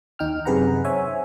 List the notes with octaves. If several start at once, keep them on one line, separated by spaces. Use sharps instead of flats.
D#2 D#4 G5 F6
F#2 C3 G#4 B4 F#5 A#5
C5 C#5 E5 G#5